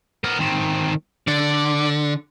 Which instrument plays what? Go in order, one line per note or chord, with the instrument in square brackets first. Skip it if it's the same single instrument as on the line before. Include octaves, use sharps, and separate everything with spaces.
[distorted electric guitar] B3 A#4
D#3 C4
[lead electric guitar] D3 [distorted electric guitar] D5